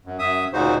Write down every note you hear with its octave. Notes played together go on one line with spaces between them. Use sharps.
F#2
F#2 E5 D#6
D2 A#2 C#3 D#4 F#4 C5